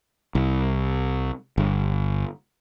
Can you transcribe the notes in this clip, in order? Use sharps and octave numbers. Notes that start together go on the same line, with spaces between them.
C2
G1